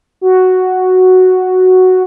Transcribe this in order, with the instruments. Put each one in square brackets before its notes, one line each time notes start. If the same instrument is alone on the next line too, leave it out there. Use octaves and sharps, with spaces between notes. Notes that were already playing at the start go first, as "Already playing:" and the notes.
[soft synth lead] F#4